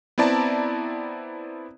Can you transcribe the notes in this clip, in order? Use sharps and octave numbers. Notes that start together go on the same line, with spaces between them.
B3 C4 E4 D5 A5 A#5